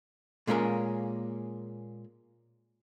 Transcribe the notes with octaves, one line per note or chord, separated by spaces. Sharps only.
A#2 G#3 A#3 C#4 A4 A#4